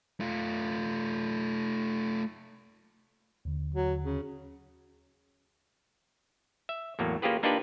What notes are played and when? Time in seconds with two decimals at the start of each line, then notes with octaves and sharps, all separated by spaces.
0.20 A3 F4
3.45 D#2 D3
3.74 F#3
4.03 C#3
6.69 E5
6.99 E2 A2 F#3 A#3
7.22 A#3 C#4 F4 G4 G#4 B4
7.43 A#3 D4 D#4 F4 G4 B4